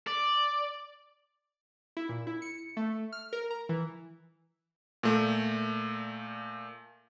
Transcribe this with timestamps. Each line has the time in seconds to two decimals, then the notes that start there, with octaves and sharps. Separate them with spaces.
0.07 D5
1.97 E4
2.09 A#2
2.27 E4
2.42 C#7
2.77 A3
3.12 F6
3.33 A#4
3.50 A#5
3.69 E3
5.03 A#2 A3